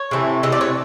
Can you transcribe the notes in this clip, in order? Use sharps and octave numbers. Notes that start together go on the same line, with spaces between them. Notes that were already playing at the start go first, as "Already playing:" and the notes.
Already playing: C#5
C3 E3 A3
C3 E3 A3 D#5
D5
C#5